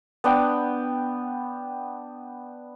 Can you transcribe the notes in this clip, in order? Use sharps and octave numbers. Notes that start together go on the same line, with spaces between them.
B3 D4 G5